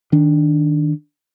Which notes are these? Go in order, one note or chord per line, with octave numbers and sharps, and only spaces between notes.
D#3 D4